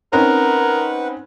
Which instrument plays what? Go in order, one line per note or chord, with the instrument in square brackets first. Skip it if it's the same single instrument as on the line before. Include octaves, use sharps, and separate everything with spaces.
[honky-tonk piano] C4 C#4 D#4 [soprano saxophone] A#4 [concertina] B4 F#5